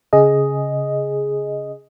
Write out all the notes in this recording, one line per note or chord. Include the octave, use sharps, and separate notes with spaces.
C#3 G#4 D#5